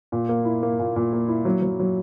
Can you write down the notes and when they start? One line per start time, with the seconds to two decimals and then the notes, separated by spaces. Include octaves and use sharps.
0.12 A#2
0.29 A#3
0.45 E4
0.63 A#3
0.79 A#2
0.96 A#2
1.13 A#3
1.29 E4
1.45 F#3
1.62 F#3
1.80 F#3